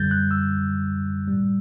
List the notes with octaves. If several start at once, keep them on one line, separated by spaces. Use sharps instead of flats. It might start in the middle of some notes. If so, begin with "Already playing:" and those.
Already playing: F#2 D3 G3 G6 A6
F#6
E6
A2 G3